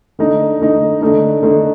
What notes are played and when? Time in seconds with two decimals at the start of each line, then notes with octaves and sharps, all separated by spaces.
0.19 D3 A3 D#4
0.60 D3 A3 D#4
1.01 D3 A3 D#4
1.43 D3 A3 D#4